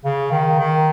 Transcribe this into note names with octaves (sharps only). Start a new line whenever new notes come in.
C#3
D#3
D#3